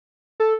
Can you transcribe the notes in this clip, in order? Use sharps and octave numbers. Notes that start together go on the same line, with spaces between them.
A4